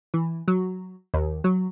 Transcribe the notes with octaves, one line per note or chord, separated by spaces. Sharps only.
E3
F#3
D#2
F#3